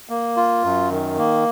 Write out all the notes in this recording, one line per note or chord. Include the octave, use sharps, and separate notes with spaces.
A#3
F4
F#2
D#3
A#3